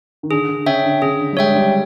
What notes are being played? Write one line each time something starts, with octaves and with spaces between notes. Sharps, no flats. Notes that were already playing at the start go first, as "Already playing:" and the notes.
D#3
D3 G#4
D3
C#3 C#5 E5 G5
D3
C#3 G#4
D3
G3
G#3 C#5 E5 G5
G3